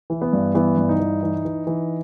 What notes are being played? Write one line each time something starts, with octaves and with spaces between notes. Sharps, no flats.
E3
B3
G2
E3 B3
G2
D#4
E3
E3
E3
E3